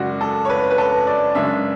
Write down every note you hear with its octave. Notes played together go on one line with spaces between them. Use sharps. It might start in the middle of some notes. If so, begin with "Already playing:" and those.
Already playing: F#2 C#3 G#3 F#4 D5
A4
C#5
B4
B4
A4
D5
F#2 C#3 G#3 D4 E5